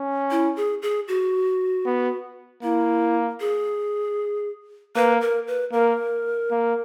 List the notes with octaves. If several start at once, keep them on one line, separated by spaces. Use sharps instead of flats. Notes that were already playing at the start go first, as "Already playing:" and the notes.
Already playing: C#4
E4
G#4
G#4
F#4
B3
A#3 E4
G#4
A#3 B4
A#4
B4
A#3 A#4
A#3